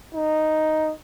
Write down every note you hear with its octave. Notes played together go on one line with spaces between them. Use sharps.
D#4